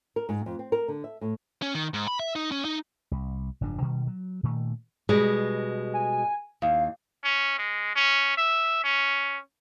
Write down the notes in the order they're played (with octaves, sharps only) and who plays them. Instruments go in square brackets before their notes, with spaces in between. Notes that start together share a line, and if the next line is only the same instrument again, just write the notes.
[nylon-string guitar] A#4
G#2
F2
C4
A#4
D3
E5
A2
[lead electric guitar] C#4
D#3
G#2
B5
E5
D#4
C#4
D#4
[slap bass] C2
F#1 G#2 F3 D4
B2 D#3 G3
F#3
A#2 D#3 A3
[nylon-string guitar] B2 G3 G#3
[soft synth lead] G#5
[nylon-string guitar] D#2 [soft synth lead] F5
[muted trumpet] C#4
G#3
C#4
E5
C#4